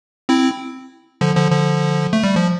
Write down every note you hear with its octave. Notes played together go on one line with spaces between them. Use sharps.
C4 E4
D3 F3
D3 F3
D3 F3
A3
G3
F3